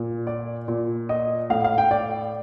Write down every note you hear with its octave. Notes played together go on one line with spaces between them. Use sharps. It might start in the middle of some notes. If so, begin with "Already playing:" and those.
Already playing: A#2
D5
A#2
D#5
A2 F5
F5
G5
D5